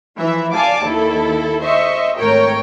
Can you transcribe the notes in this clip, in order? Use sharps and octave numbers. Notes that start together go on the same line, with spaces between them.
E3 F3 E5
D5 F5 G#5 A5 D6
D#2 E4 A4
C5 D#5 E5 C#6
G#1 A3 A#4 C#5 G5